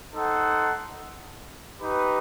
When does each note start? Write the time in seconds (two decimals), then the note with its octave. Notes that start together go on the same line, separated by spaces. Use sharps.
0.14 D#4 A4 C5 F#5
1.80 D#4 G4 B4